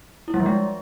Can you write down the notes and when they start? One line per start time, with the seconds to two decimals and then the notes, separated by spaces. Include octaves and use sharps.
0.28 E4
0.34 G3
0.40 F3
0.46 G#3